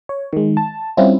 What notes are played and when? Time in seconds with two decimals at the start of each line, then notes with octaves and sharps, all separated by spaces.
0.09 C#5
0.33 D#3 G#3
0.57 A5
0.97 G3 C4 C#4 E4 F4